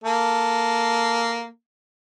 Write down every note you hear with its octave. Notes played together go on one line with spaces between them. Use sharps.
A#3 A4